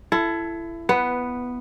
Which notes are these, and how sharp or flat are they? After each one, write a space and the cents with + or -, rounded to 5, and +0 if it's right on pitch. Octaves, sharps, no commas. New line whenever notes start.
E4 +25 A4 +0
B3 +0 B4 +15